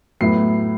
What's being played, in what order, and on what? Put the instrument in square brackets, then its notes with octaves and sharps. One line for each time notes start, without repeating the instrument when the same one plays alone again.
[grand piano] A2 F#3 B3 E4 C7